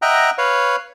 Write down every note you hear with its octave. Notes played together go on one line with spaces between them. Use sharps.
D#5 E5 F#5 G5 A#5
B4 C#5 F5